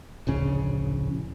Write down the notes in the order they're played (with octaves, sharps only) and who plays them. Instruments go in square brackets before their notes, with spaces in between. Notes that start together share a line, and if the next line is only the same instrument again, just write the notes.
[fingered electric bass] D1 A#1 C#3